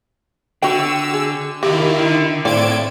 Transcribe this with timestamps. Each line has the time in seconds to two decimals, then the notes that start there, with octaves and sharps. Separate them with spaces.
0.62 D3 F#4 G5 E6
1.14 G#4
1.63 D#3 E4 F#4 G4 F5
1.99 D3 D#4
2.45 A2 C4 A4 D5 F5 G#6 D7